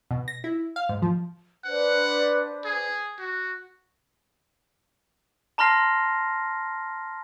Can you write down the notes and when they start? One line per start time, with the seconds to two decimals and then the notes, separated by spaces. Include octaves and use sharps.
0.11 B2
0.28 A#6
0.44 E4
0.76 F5
0.89 G#2
1.02 F3
1.65 D4 B4 C5 F#5
2.65 G#4
3.19 F#4
5.58 A5 A#5 C6 F6 A#6 C7